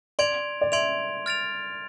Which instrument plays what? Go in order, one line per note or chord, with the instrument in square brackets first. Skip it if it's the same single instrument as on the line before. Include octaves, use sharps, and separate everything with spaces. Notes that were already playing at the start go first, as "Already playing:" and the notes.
[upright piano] D5 [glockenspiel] C6 G#6 D7 F7
[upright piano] D5
[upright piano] E5 [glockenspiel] C6 G#6 D7 F7
[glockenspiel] F6 A6 D7 F7